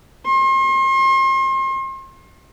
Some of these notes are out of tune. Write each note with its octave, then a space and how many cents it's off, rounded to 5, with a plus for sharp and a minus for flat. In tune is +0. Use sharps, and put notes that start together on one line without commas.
C6 +40